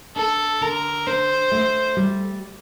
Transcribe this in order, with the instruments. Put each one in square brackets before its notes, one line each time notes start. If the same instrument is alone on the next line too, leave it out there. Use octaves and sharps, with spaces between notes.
[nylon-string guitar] D4 [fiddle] A4
[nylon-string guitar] D3 [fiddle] A#4
[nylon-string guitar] D4 [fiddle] C5
[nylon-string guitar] A3
G3